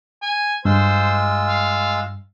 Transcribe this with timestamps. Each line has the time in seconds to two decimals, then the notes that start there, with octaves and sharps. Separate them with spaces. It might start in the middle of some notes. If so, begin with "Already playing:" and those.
0.22 G#5
0.65 G2 G#3 F4 C5 E6
1.48 F5